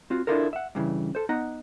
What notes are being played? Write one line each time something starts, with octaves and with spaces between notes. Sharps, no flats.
C4 F4 F#4
D4 E4 F4 A4 A#4
E5 F#5
G2 C#3 E3
A4 C5
B3 D#4 F#5 A#5